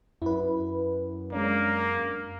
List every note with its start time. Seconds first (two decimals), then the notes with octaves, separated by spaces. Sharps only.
0.22 F#2 E4 B4
1.32 G#3 A#3 C#4 D4